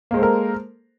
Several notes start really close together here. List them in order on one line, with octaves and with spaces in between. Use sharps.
A#3 G#3 C5 A4 A#4